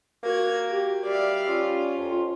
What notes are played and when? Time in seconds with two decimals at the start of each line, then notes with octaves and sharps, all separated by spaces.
0.23 A#3 F#4 A#4 G#6
0.69 G4
1.06 G3 D5 E5 F5
1.50 C#4 F4
1.97 F2